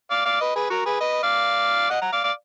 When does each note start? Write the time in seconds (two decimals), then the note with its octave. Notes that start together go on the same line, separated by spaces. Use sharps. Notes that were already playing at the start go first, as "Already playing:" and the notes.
0.11 D5 F5
0.25 D5 F5
0.40 B4 D#5
0.56 G#4 B4
0.70 F#4 A#4
0.86 G#4 B4
1.01 B4 D#5
1.23 D5 F5
1.90 D#5 F#5
2.02 F#5 A#5
2.12 D5 F5
2.24 D5 F5